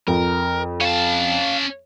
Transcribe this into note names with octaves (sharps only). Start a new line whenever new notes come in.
F2 A#4
C#4 F5 A5